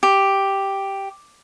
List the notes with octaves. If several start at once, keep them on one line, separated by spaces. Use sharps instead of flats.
G4